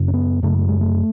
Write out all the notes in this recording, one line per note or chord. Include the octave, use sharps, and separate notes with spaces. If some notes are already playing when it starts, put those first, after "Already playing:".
Already playing: F#2 C#3
C#4
B3
F#2 C#3 A3
A3
G#3
A3